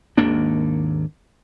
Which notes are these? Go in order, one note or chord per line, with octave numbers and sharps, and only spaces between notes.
G#1 D#2 A#3 D4